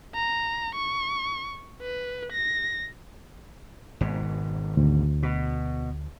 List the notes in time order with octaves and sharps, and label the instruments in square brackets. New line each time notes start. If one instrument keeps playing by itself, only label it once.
[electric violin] A#5
C#6
B4
A#6
[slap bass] G#1 G#2 B2
[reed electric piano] D2
[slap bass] B2